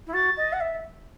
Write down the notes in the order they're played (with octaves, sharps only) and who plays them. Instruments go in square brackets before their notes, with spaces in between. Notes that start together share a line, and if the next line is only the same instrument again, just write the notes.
[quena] E4
[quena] F#4 [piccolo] A6
[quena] D#5
F#5
E5